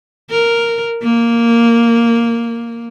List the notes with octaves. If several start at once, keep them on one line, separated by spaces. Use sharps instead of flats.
A#4
A#3